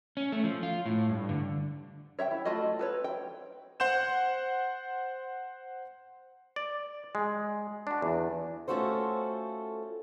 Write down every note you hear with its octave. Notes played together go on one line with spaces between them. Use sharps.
C#4
A3
F3
F4
A2
G2
D3
C#5 E5 F#5 G5
E4
A3 F4 F#4 D#5
A4 B4 C#5
G5
C5 F#5 C6 G6 E7
D5
G#3
D4 F#4
E2
A3 C#4 F4 F#4 A4 C5